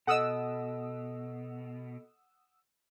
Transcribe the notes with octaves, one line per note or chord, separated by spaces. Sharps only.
B2 A4 D#5 F#5 D#6 E6